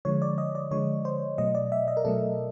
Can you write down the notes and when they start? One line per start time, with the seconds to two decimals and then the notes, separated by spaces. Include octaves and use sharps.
0.05 D3 F3 G#3 C#5
0.22 D5
0.38 D#5
0.55 D5
0.71 D3 F3 G#3 C#5
1.05 C5
1.38 B2 F#3 A3 D#5
1.55 D5
1.72 E5
1.88 D#5
1.97 A#4
2.05 B2 F#3 A3 A4